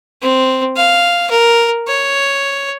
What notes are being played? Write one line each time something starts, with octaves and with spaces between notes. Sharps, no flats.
C4
F5
A#4
C#5